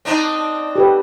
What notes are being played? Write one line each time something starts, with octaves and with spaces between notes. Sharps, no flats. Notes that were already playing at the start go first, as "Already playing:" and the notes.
C4 D4 D#4
G4 A4 B4